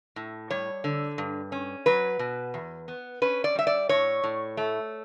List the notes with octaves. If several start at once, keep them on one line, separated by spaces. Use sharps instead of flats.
A2
G3 C#5
D3
G2
C#4
F#3 B4
B2
E2
B3
C#4 B4
D5
G3 E5
D5
A2 C#5
A2
A3